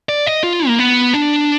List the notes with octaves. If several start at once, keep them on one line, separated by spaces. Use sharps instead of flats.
D5
D#5
F4
A#3
B3
D4